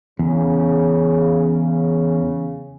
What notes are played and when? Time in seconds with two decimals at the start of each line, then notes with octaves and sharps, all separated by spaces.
0.19 E2 C#3